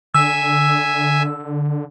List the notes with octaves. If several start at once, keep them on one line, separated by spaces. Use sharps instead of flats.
D3 E5 G#5 E6